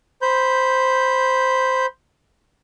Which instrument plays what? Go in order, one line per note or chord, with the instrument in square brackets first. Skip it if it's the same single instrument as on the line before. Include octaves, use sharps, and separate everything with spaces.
[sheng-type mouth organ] C5 B5 G6